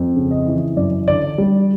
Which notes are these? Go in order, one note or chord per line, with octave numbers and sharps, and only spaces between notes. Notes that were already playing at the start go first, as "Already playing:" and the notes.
Already playing: F2
C#3
D#5
E3
F#2 D5
D3 D5
G3